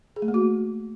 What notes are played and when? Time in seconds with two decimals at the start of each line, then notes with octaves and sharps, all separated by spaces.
0.16 G#4
0.22 A3
0.28 A#3
0.34 F#4